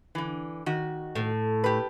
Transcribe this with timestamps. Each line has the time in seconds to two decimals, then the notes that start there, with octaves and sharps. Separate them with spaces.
0.15 D3 E3
0.66 D#3 F#4
1.15 A2
1.64 G4 B4